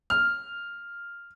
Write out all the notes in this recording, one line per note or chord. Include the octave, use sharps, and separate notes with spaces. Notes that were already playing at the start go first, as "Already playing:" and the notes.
F6